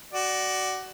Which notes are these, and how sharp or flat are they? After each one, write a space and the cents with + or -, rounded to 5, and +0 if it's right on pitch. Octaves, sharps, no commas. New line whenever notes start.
F#4 +20 D5 +0